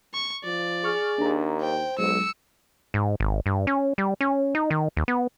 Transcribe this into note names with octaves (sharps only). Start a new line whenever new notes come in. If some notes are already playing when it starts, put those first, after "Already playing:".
C#6
F3 D5
G#4 C#6 F6
D#2 D4 A#5
C5 G5
B1 F#3 G#3 E6 C#7
G#2
G#1
G2
C#4
G3
C#4
D#4
D#3
D#2
B3